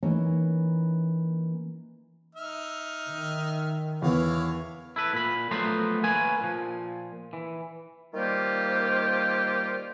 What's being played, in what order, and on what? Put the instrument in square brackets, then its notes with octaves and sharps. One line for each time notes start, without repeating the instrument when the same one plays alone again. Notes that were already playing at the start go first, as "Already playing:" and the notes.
[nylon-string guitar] E3 A#3 C#4 D#4
[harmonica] D#4 E5 F6
[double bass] D#3
[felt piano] E2 [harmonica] E4 C#5 F5
[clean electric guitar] E4 A4 B4
A#2 B5
F3 F#3 A3 B3 A#5 C6
A#3 C#4 B4 G#5
A#2 F3
E3
[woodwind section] D#3 G3 A#3 F4 G4 C5